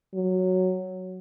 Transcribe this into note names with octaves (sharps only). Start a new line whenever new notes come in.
F#3